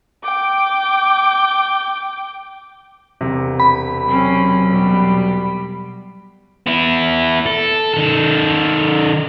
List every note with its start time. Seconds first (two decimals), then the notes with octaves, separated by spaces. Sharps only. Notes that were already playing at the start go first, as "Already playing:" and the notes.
0.24 G5 D6
3.21 E1 C3
3.60 B5
4.07 F#3 C4 C#4
4.71 B2 G3
6.66 B3 E4
7.46 A4
7.94 D#3 A4